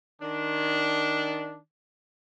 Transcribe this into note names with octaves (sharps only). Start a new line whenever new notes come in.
D#3 D4